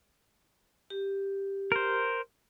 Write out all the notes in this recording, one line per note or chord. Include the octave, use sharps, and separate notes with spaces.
G4
A#4 C5